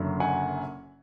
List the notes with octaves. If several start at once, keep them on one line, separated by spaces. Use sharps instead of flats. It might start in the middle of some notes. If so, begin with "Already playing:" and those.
Already playing: F#1 F#2 D3 F#3
F#5 G#5